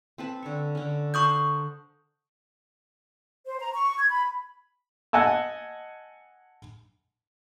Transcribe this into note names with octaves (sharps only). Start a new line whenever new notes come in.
C4 B4 A5
D3 C#5 C#6
D3 C#4
A#4 C5 A5 C#6 D#6 G6
C5
A#5
C#6
G#6
B5
D#5 F#5 G#5 A5 E6